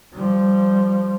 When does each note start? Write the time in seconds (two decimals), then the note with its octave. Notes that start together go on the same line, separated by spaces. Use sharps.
0.13 F3 G3